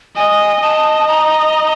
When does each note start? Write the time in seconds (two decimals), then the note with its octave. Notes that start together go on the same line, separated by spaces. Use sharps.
0.16 D#5 G#5
0.61 D#5 A5
1.08 A#5